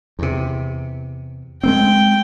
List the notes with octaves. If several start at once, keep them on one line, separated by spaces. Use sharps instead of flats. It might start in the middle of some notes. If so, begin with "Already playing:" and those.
E2 C3
G#3 A#3 C4 G5